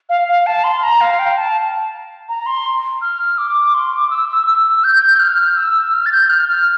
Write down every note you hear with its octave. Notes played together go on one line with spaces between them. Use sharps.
F5
F5
A5
C6
A#5
F5
G5
A5
A#5
C6
F6
D6
C6
D6
E6
E6
E6
G6
F6
E6
F6
A6
G6
F6
F6